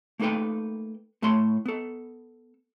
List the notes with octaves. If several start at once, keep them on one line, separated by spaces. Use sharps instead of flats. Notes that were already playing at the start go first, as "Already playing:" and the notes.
A3 A#3 D#4 A4 B4 G5
A2 A3 A4 C#5 C6
B3 A4